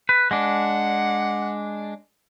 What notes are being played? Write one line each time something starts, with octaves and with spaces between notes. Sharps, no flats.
B4
G#3 D4 F#5